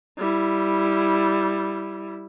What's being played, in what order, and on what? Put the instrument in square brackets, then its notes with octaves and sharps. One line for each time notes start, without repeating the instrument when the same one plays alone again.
[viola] G3 E4